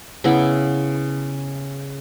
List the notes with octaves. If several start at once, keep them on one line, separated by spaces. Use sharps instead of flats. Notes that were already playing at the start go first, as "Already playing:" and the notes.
C#3 B3 E4 B5